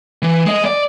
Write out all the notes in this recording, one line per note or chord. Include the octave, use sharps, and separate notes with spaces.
E3
G#3 D#5
D5